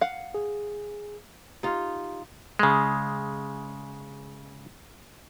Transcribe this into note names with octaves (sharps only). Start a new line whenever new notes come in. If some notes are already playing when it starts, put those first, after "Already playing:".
F5 F#5
G#4
D#4 F4 G4
C#3 G#3